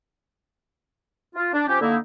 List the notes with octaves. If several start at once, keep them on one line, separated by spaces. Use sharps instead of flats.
F4
D4
F3 C#4 G4
D3 A#3 D#4 E4